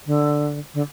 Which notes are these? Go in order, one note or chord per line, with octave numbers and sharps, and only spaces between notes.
D3
D3